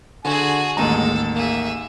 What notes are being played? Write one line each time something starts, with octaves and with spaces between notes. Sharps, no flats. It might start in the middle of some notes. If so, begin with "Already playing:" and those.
D3 F#4 G#4 G#5
A1 D#2 G#3 A4 A#5
A#3 G#4 E5